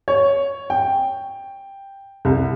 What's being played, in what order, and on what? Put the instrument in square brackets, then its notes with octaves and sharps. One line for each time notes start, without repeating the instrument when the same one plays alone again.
[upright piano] C#5
G5
C2